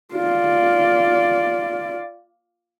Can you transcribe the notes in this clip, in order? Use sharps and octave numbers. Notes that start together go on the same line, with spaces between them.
F4 D5